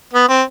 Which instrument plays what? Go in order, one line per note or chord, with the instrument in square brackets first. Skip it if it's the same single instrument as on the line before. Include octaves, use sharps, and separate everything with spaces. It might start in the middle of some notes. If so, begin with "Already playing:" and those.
[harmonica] B3
C4